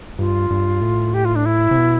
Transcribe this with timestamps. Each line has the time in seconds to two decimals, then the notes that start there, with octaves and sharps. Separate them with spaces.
0.19 G2 F4
0.50 G2
0.82 A2
1.14 G4
1.25 F4
1.36 D4
1.46 E4
1.71 C3
1.77 B2